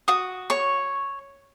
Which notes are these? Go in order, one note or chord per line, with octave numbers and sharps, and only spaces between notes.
F#4 D#6
C#5 C#6